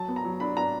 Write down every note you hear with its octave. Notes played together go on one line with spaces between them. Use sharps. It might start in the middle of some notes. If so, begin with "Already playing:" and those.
Already playing: F#3 A5
B3
A#5
F#3
D4 B5
D4 A#5